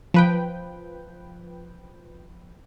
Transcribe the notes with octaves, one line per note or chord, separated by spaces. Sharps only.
F3 B4 G5